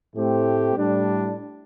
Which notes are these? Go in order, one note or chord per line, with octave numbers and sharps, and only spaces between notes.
A2 A3 C4 G4
A2 G3 D4